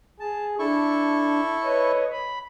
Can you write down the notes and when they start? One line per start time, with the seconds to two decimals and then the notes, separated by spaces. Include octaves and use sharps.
0.20 G#4 A5
0.59 D4 E4 A4 C#6
1.63 B4 C#5 D#5
2.12 B5